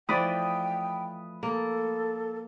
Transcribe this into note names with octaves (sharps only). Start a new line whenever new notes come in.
E3 F3 A3 D5 G5 B5 D#6 F#6
A#3 A4